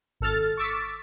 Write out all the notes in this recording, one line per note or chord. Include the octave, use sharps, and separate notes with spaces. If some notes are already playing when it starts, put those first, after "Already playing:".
G#1 A4 F6 A6
C#6 D6 E6 A6 B6